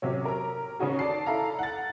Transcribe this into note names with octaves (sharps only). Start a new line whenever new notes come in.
C3 F#3 C#4
A#4 A#5
C#3 C#4 D#4 F#4 G#4
D5 A5 C7
E4 A4 F5 A#5
F#5 A6